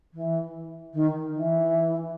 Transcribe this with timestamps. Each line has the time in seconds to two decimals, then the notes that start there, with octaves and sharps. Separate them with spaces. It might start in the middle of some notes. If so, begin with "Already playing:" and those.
0.14 E3
0.93 D#3
1.34 E3